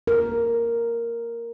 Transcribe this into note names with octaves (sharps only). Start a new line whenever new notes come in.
A#4